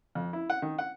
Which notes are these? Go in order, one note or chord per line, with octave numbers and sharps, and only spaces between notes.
F2
E4
F#5
D#3
F#5